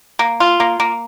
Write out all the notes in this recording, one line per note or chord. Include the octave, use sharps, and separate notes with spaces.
A#3
F4
A#3
A#3